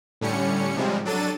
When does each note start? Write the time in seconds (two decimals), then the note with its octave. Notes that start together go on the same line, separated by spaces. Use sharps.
0.21 A2 D3 G3 C#4 C#7
0.76 G#2 C3 F3 G3 G#3
1.05 F#3 D4 A4 A6 D#7